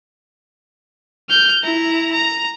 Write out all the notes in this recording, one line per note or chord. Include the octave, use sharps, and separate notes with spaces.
F6 G6
E4 A#5
A#5